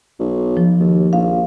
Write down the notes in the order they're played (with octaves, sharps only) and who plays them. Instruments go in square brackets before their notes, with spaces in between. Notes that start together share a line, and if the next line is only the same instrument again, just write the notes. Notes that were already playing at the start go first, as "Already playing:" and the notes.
[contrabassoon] B1
[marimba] F3
[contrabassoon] D#2
[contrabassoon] A#1 [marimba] F5